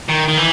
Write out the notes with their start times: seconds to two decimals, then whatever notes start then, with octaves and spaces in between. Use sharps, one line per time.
0.09 D#3
0.28 D#3
0.37 E3